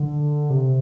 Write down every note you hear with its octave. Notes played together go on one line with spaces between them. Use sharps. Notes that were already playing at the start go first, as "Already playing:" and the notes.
Already playing: D3
C3